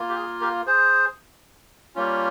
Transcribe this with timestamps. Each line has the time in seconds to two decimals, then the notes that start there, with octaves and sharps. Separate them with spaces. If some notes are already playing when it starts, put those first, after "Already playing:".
Already playing: A#3 F4
0.09 G4
0.15 G#4
0.41 G4 A#4
0.66 G#4 C5
1.95 G3 A#3 C#4 F4